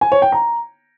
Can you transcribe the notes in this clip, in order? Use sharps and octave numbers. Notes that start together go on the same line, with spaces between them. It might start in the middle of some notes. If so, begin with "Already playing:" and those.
G#5
C#5
G5
A#5